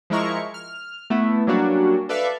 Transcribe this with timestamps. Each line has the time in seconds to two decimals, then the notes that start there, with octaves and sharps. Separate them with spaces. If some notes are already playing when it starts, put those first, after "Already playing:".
0.10 F3 G#3 E4 A#4 C#6
0.54 F6
1.10 A3 B3 E4
1.47 F#3 G3 A#3 C#4 D4 F#4
2.09 A4 B4 D5 E5 F5